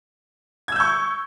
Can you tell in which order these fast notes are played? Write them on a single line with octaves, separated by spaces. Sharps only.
G#6 E6 G6 C#6